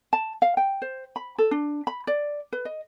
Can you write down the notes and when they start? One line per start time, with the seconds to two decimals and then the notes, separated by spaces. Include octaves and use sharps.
0.13 A5
0.42 F5
0.57 G5
0.82 C5
1.16 B5
1.38 A4
1.51 D4
1.87 B5
2.07 D5
2.53 B4
2.65 D#5